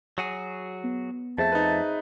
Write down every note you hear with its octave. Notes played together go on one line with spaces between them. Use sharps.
F#3 F#4 G#4
B3
F2 A3 G#4 C5 E5 A5
D#4 B4